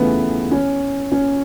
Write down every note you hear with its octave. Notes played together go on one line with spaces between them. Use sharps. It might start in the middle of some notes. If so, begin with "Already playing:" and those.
Already playing: E2 C#3 E3 A3 B3
C#4
C#4